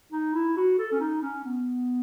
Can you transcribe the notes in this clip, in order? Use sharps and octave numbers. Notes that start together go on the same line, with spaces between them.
D#4
E4
F#4
A4
C#4
D#4
C#4
B3